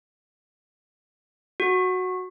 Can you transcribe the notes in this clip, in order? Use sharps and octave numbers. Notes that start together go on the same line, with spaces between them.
F#4